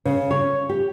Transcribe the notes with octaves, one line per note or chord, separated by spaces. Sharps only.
C#3
C#5
G4